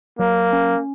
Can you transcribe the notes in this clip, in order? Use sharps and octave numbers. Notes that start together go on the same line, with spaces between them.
F#3 A#3
C#4